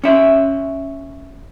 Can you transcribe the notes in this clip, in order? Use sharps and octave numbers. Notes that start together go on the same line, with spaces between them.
C#4 E5